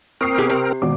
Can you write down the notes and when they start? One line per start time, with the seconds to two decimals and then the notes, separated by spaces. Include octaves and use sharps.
0.21 C4 A#4 C#6 D#6 C7
0.38 B2 G4 G#4
0.50 C3
0.82 G#1 B2 D6